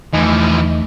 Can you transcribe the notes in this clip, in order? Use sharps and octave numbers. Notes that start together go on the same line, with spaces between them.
E2 E3 F3 A3 D#4